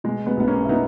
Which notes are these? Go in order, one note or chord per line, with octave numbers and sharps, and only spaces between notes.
B2 G#3
G#3 B3
B1 B3
A#3 C#4
E4
B2 B3 D#4